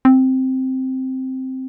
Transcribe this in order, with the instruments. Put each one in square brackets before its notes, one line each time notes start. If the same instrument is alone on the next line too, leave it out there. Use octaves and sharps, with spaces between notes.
[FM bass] C4